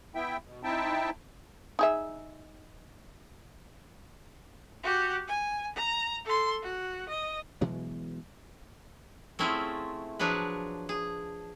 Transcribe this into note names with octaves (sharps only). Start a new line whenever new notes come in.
B3 E4 E5 G5
B2
C4 D#4 E4 E5 G5 A5
D#4 G#4 E5
F#4 G4
G#5
A#5
A4 C6
F#4
D#5
B2 E3 F#3 G#3
A3 C4 C#4 E4 F4 G#4
F3 F#3 D4 G#4 B4
G#4